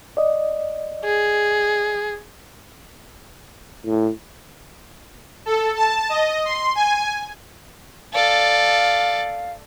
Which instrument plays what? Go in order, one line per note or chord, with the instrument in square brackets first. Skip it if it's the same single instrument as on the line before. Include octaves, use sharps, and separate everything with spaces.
[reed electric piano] D5 D#5
[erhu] G#4
[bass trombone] A2
[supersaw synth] A4
A5
D#5
C6
G#5
[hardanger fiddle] A4 D5 [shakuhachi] F5